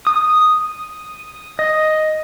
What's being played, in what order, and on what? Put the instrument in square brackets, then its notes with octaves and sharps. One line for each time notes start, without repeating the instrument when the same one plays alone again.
[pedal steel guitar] D#6
D#5